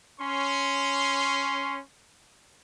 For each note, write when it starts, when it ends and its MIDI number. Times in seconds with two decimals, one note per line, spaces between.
0.20 1.80 61
0.20 1.80 84